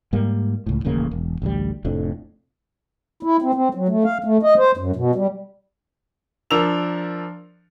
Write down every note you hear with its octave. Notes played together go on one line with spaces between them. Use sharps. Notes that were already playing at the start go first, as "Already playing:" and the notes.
G#2 G3 A#3
C#2 A2
D#1 A1 C#3 A#3
E1
A1 D2 G3
F1 F2 A2 D4
E4
C4
C4
F#3
A3
F5
A3
D#5
C5
F#2
B2
G3
F3 D4 A#4 E6 F7